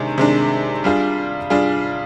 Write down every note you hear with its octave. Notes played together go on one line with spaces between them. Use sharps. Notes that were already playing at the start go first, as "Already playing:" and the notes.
Already playing: C3 D#3 G#3 D4
C3 D#3 G#3 D4
G3 D4 F4 G#4
G3 D4 F4 G#4